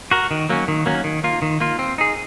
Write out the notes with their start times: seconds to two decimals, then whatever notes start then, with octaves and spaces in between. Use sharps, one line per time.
0.11 F#4 A#4
0.31 D#3
0.49 F#3 A#3 C#4
0.68 D#3
0.86 F#3 A#3 C#4
1.04 D#3
1.24 A#3 F4
1.42 D#3
1.60 A#3 F4
1.79 C4
1.98 D#4 G#4